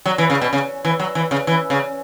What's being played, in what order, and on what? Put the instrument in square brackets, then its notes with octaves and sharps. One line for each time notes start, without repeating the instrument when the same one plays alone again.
[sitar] F#3
E3
C#3
B2
C#3
E3
F#3
E3
C#3
E3
C#3